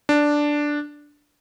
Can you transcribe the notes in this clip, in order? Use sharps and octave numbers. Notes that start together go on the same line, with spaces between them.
D4